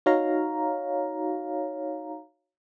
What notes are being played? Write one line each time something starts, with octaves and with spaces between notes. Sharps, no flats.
D#4 F#4 C#5 F5 A#5